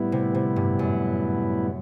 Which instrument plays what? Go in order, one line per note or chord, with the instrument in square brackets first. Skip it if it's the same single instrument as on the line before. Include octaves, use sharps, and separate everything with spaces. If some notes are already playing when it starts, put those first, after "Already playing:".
Already playing: [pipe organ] A2 G3 B3 E4
[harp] C3
C3
G2
F#2